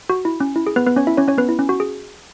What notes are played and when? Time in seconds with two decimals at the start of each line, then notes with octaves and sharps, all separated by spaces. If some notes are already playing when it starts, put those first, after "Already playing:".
0.09 F#4
0.25 E4
0.40 C#4
0.56 E4
0.67 G#4
0.76 B3 B4
0.87 B3 B4
0.96 C#4 C#5
1.07 E4 E5
1.17 C#4 C#5
1.28 C#4 C#5
1.38 B3 B4
1.49 E4
1.59 C#4
1.69 F#4
1.80 G#4